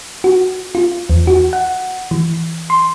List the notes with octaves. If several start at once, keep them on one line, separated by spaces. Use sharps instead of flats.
F#4
F4
E2
F#4
F#5
E3
C6